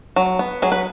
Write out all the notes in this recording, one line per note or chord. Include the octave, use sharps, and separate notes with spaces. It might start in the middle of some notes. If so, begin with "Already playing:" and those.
F#3
B3
F#3 G#4
B4